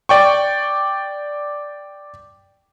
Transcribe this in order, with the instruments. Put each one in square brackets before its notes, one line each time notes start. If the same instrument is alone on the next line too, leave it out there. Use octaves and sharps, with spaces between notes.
[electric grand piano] D5 G5 C#6